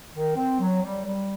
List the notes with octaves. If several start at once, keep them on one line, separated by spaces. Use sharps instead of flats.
D#3
C4
F#3
G3
G3